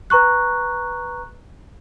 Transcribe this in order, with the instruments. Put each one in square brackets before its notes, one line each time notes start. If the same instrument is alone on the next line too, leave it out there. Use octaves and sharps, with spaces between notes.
[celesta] B4 A#5 C#6 F#6